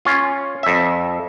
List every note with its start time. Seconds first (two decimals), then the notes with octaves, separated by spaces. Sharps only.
0.05 C#4 F4
0.63 F2 E5